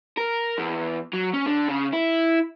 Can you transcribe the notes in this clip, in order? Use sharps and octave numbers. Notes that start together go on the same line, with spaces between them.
A#4
E2
F#3
C#4
D3
C#3
E4